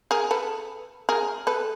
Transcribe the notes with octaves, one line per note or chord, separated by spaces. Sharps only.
G#4 A#4
A4 B4
G#4 A#4
A4 B4